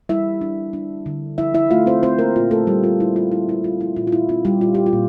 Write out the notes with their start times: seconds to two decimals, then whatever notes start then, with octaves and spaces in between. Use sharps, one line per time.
0.09 G3 E4 E5
0.41 D4
0.73 D4
1.06 D3
1.38 F3 E4 E5
1.54 E4 E5
1.71 A3 F4 F5
1.86 C4 C5
2.03 A3 C4 C5
2.19 A#3 A#4
2.36 A#2 F4
2.51 A3 A4
2.67 G3 A3 G4
2.83 F4
3.00 F3 E4
3.16 F4
3.32 A3 E4
3.49 E4
3.64 F3 F4
3.81 E4
3.96 A#2 F4
4.07 F4
4.12 E4
4.29 C4 F4
4.45 G3 G4
4.61 A#2 F4
4.75 G4
4.86 F4
4.93 A#2